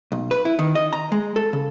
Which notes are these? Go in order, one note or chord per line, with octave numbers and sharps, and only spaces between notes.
B1
B4
E4
D#3
D#5
A#5
G#3
A4
C#3